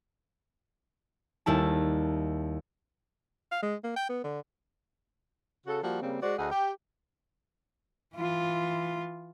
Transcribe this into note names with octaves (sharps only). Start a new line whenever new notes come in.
D#2 G3 E4 A5
F5
G#3
A#3
G5
B3
D3
C#3 F#4 A4
F3 G3 A#3 F#4
C#3 G3 A#3 C4
G#3 F#4 C5 D5
D2 G#4 D#5 F#5
G4
E3 F4